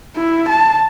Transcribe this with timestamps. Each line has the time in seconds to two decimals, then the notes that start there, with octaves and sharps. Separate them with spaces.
0.16 E4
0.49 A5